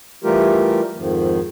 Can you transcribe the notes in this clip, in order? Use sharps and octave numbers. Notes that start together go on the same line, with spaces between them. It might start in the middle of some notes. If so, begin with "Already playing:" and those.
E3 G3 A3 F4 G4 A#4
F2 G#2 D#3 F3